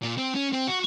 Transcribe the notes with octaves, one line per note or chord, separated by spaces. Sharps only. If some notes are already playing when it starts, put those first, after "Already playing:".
A#2
C4
C#4
C4
F#4